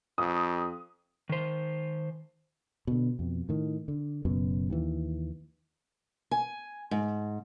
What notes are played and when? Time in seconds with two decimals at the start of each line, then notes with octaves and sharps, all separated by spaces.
0.18 F2 D#6
1.29 D#3 C5
2.87 B2 D3
3.19 F2 B2
3.49 A2 D#3
3.88 D3
4.25 F#1 F#2 B2
4.70 D#2 E3
6.31 G#5
6.91 G#2